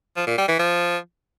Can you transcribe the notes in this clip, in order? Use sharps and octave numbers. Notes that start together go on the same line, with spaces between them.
F3
A#2
G3
E3
F3